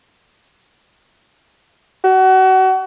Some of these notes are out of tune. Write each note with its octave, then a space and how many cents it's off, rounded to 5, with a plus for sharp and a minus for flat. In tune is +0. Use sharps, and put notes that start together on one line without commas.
F#4 +30